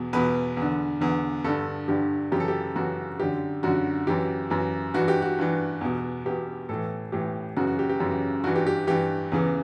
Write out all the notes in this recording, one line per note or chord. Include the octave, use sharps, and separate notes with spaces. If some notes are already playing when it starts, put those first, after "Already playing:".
Already playing: E2 B2
E2 B2 B4
E2
D3
E2 D3
G2 D3 A4
G2 D3 G4
F#2 C#3 E3 G4
A4
G4
F#2 C#3 E3 F#4
F#2 D3 G4
F#2 D3 F#4
F#2 E3 G4
F#2 E3
G2 E3 F#4
G4
F#4
G2 E3
E2 B2
E2 B2 G4
A2 E3 A4
A2 E3 G4
F#2 C#3 E3 F#4
F#4
G4
G4
F#2 C#3 E3
G2 E3 F#4
G4
G4
G2 E3 G4
E2 C#3 E3